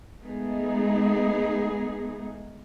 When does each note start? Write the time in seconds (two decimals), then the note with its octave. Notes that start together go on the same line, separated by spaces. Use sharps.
0.21 G#3 A3 B3 D#4 G#4